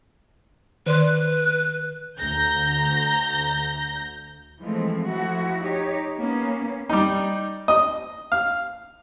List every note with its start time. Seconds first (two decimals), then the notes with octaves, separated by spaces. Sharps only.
0.86 D#3 B4 D5 C6
2.19 D2 A#5 G6 A#6
4.59 E3 F3 G#3 A3 C4
5.06 F3 A3 E4 F#4
5.60 D#4 G4 C#5
6.18 A#3 B3 C#4
6.89 G3 D#4
7.68 D#5
8.32 F5